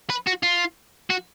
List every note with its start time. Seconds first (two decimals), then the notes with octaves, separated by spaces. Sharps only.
0.10 B4
0.27 F#4
0.43 F4
1.10 F#4